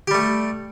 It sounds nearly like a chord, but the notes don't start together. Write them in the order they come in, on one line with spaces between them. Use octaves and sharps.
G4 G3 A3